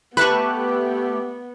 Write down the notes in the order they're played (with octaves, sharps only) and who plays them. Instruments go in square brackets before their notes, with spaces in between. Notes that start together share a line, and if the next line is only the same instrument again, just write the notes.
[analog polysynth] A3 G4 [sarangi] B3 [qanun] B4 A5 C#6 [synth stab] B5 F#6